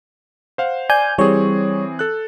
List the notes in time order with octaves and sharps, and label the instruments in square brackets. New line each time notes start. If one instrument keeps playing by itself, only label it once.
[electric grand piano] C5 F5 F#5
[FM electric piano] D5 G#5 G6
[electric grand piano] E3 C4 G#4 [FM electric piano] G3 C#5
[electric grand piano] A4 F#6